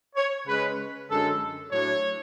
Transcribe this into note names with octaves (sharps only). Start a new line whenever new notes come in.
C#5
C#3 G#3 C#4 B4
F#2 D3 G#3 A4
A2 F#3 A3 D4 C#5